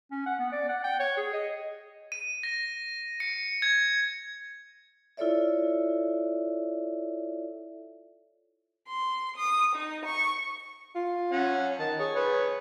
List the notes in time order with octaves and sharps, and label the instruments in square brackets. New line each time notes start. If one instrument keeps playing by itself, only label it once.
[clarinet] C#4
F#5
B3
D5
F#5
G5
C#5
G#4
D#5
[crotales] D#7
A#6
C#7
G#6
[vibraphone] E4 F4 A4 C#5 D5 E5
[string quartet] C6
D#6
D#4
C#6
[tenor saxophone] F4
[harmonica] C#4 F#5
[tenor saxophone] D#3 [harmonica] A5
[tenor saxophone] G#4 [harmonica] C#5
[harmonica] B4 C#5